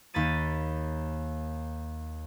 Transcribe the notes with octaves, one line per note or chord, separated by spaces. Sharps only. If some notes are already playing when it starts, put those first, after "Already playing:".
D#2 A#3 B5 A6 D#7